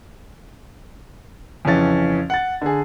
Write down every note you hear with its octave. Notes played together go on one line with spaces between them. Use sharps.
F2 C#3 E3 C#4 A6
F#5 A6
D3 G#4